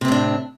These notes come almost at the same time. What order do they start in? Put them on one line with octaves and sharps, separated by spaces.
C3 C4 A2 D4